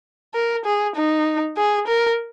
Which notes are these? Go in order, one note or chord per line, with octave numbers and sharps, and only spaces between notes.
A#4
G#4
D#4
G#4
A#4